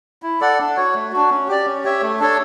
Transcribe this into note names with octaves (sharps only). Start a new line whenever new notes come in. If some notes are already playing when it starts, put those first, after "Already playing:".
E4
A4 D5 F#5
D4
F#4 C#5
A3
D4 F#4
C#4
G4 D5
C#4
G4 C#5 E5
A3
D4 A4 C#5